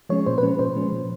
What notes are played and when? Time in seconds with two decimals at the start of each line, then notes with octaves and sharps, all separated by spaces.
0.09 F3 G#3 C#4 C#5
0.26 A#2 C5
0.38 B4
0.43 F3 G#3 C#4
0.59 A#2 C5
0.76 F3 G#3 C#4
0.92 A#2